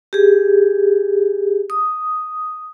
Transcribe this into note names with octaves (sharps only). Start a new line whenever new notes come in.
G4 G#4
D#6